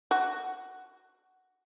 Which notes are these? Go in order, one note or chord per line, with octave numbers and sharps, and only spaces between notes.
F#4